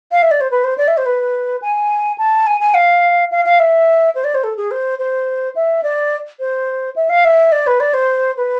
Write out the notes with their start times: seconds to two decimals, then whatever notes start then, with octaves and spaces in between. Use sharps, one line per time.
0.11 F5
0.22 E5
0.31 D5
0.40 C5
0.51 B4
0.64 C5
0.77 D5
0.87 E5
0.97 C5
1.06 B4
1.62 G#5
2.18 A5
2.47 G#5
2.60 G#5
2.74 F5
3.31 F5
3.45 F5
3.59 E5
4.15 C5
4.24 D5
4.34 C5
4.43 A4
4.57 G#4
4.71 C5
4.99 C5
5.55 E5
5.83 D5
6.39 C5
6.96 E5
7.09 F5
7.24 E5
7.52 D5
7.67 B4
7.80 D5
7.93 C5
8.37 B4